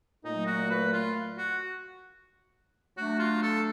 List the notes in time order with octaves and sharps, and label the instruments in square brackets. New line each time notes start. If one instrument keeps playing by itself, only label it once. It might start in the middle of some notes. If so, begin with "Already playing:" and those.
[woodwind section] A#2 F#3 A3 [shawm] D#4
[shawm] F#4
B4
F4
F#4
[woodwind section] F#3 A3 D4 [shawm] F#4
[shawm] F4
A4